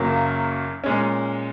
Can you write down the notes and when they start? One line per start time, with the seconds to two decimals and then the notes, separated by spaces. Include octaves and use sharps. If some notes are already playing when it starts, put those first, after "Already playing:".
Already playing: F#1 F#2 C#3 F#3 A#3
0.84 A#2 G#3 C#4